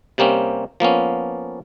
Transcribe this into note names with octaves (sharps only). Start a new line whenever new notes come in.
C3 G3 A#3 C4 C#4
F3 A#3 B3 C#4